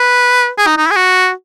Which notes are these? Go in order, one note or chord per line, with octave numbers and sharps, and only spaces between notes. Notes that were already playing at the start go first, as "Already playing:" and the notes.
Already playing: B4
G#4
D#4
D#4
E4
G#4
F#4